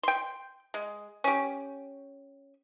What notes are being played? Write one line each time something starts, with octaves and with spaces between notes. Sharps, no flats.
G5 C6
G#3
C#4 G4